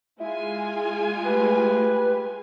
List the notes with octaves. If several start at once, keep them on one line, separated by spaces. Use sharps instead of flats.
G#3 E4 F4 G#5
A3 G4 B4